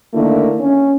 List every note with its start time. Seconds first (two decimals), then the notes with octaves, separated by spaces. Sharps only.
0.14 D3 D#3 A3 A#3 D4 E4
0.60 C#4